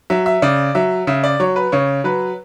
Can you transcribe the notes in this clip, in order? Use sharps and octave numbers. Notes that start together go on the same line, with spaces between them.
F#3 E5
E5
C#3 D5
F#3 E5
C#3 E5
D5
F#3 C#5
B4
C#3 C#5
F#3 B4